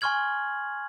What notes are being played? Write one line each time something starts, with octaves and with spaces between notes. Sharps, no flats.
G#5 C6 C#6 F6 G#6 F#7